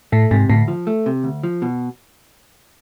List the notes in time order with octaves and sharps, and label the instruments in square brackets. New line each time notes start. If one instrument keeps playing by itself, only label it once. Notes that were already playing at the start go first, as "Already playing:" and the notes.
[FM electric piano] A2 [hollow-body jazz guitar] A3
[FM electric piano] G#2 [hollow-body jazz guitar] C3
[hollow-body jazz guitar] D2 [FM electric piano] A2
[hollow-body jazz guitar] F3
A3
C3
D2
F3
B2